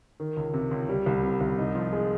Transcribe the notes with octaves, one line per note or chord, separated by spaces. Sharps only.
D#3
C#2
C3
C#2
G3
C2
C3
C2
D#4
F3
G#3